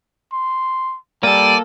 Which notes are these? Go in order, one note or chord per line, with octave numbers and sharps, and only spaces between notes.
C6
G3 A#3 A4 D5 D#7